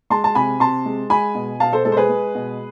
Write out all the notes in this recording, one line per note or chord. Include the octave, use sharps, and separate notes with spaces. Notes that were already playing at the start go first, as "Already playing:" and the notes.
G#3 A5 C6
A5
C3 G#5 B5
C3 A5 C6
G#3
G#3 G#5 B5
B2
B2 F5 A5
A4 C5
G#3 A4
C5
G#4 B4
G#3
B2